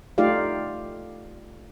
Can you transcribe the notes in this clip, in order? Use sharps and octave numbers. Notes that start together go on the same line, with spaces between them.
A3 D#4 F4 G4 D5 F5